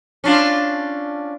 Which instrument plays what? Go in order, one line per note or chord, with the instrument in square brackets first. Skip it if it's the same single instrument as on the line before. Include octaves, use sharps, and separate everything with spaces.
[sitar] C#4 D4 F4